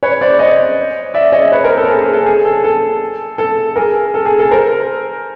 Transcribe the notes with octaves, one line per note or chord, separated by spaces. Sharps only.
B4 C#5
C5 D5
C#5 D#5
D5 E5
C#5 D#5
B4 C#5
A#4 C5
A4
G#4 A#4
G#4
A4
G#4
A4
A4
A4
G#4 A#4
A4
G#4
A4
A#4 C5